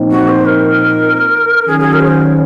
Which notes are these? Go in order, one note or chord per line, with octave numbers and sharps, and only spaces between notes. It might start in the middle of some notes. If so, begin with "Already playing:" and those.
Already playing: A#2 F3 C4 D#4
F#4
C5
A#4
D#3 F#3 C#4 G#4
G#4
A#4
C#5
C5